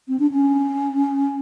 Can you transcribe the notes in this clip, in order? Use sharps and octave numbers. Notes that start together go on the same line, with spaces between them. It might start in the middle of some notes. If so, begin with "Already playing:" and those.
C4
D4
C#4